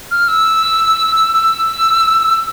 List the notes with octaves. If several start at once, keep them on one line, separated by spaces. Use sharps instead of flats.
F6
E6
E6